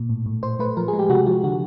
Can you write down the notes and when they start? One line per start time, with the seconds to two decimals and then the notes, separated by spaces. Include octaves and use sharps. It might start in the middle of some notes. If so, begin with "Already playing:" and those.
Already playing: A#2
0.09 A2
0.26 A2
0.43 A2 C5
0.59 A3 B4
0.77 F3 A#4
0.88 G#4
0.93 G#3
0.99 G4
1.09 C3 F#4
1.26 F3 F#4
1.44 D3 F#4